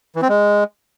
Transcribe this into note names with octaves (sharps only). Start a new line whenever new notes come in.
E3
C4
G#3